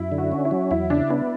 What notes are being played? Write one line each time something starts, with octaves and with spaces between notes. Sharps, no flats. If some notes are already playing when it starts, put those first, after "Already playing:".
Already playing: F#2 E4
D3
F#4
C#4
E4
F#3
E2 E4
C#3 D4
B3 D4